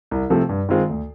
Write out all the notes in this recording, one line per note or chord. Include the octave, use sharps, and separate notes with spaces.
C2
C3 F3 A3
G2
D#3 G#3 C4 F4
D2